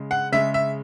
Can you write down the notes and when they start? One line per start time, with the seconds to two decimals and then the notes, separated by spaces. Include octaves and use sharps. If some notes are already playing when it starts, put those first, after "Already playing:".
Already playing: C#3 G#3
0.11 F#5
0.32 C#3 G#3 E5
0.54 E5